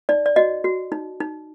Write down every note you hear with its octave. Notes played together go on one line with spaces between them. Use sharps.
D#4 D5
D5
F#4 D#5
F#4
D#4
D#4